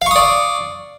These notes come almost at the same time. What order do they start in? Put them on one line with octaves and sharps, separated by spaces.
F5 C#6 D#6 D5